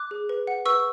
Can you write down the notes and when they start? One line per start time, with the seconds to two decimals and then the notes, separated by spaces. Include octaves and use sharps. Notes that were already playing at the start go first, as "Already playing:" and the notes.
Already playing: D6 F#6
0.11 G#4
0.29 B4
0.47 F#5
0.66 B4 C#6 E6